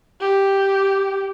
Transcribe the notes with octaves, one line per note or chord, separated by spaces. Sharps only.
G4